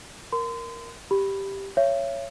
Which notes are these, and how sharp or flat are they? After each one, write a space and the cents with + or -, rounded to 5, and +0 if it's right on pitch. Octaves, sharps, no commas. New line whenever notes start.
A#4 +0 C6 -35
G4 +0 B5 +0
C#5 +0 E5 +40